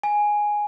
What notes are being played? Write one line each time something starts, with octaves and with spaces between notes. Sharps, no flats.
G#5